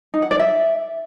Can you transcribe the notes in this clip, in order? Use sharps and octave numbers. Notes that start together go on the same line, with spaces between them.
D#4
F#5
D5
E5